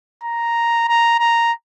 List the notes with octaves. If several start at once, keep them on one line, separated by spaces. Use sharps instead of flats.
A#5
A#5
A#5